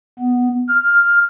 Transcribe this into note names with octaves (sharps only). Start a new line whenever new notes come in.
B3
F6